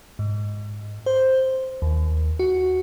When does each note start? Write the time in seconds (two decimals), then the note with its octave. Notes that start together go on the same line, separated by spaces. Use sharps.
0.19 G#2
1.06 C5
1.82 D#2
2.39 F#4